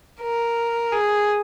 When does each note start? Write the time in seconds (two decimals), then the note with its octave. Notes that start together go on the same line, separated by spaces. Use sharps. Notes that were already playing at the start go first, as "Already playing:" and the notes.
0.21 A#4
0.92 G#4